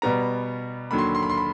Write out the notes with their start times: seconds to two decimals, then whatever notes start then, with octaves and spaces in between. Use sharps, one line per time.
0.02 B2 G3 B3 A#5
0.91 D#2 D3 F#3 B5
0.98 C6
1.07 B5
1.15 C6
1.23 B5
1.30 C6
1.37 B5